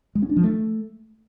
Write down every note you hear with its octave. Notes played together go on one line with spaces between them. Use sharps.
G#3
C#4
D4
F3
A3